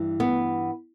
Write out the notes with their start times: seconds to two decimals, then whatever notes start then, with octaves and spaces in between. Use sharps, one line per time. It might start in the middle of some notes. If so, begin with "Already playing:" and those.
Already playing: G2 E3
0.20 B3